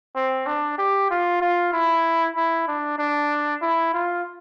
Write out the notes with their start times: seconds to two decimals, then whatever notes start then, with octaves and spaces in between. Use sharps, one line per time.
0.16 C4
0.47 D4
0.78 G4
1.11 F4
1.41 F4
1.73 E4
2.36 E4
2.68 D4
2.99 D4
3.62 E4
3.94 F4